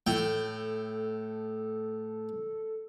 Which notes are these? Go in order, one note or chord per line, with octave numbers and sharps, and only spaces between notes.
A2 A4 G5